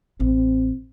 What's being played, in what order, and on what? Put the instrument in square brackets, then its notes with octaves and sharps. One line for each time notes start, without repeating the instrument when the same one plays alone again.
[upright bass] A1 [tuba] C4